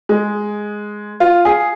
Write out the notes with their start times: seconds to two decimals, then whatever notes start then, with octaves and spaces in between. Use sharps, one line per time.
0.09 G#3
1.20 F4
1.45 G#4